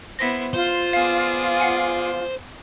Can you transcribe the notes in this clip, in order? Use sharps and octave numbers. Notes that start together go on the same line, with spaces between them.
B3 E4 C5 A#6 B6
F4 C5 G6
B3 G#4 D5 F5
F5 F#5 G#5